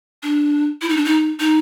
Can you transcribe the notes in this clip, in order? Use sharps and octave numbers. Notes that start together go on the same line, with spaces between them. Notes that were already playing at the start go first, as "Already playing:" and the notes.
D4
E4
D#4
D4
D#4
D#4